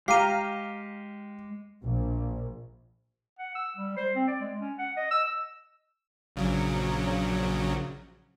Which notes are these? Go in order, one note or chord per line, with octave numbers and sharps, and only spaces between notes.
G#3 G4 F5 A#5 F6 C7 D#7
A#1
F#5
E6
G3
C5
C4
D5
G#3
C#4
F#5
D#5
E6
A#1 C#3 F#3